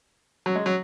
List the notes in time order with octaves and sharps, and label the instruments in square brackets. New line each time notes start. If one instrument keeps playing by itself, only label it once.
[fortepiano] F#3
G#3
F#3